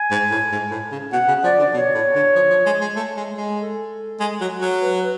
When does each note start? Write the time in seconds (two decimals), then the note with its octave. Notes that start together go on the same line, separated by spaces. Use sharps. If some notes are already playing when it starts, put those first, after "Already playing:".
Already playing: G#5
0.11 G#2
0.31 A2
0.52 G#2
0.71 A2
0.91 C#3
1.12 B2 F#5
1.28 C#3
1.43 F3 D5
1.59 D3
1.74 B2 C#5
1.94 A2
2.15 D3
2.35 F3
2.50 F3
2.66 G#3
2.81 G#3
2.96 A3
3.17 G#3
3.37 G#3
3.59 A4
4.20 G#3
4.41 F#3
4.61 F#3
4.81 B4